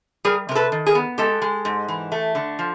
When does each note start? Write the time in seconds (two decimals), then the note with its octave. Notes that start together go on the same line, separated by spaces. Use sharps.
0.25 G3 G#4 A#4
0.49 C3 A#4
0.55 A4 B4
0.72 D#3
0.86 G#4 A#4
0.95 B3
1.18 G#3 G4 A4
1.42 G#3
1.65 G#2
1.88 E3
2.12 A3
2.35 D3
2.59 F3